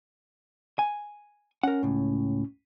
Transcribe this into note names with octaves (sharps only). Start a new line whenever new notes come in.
G#5
C#4 A#4 F#5
C#2 A2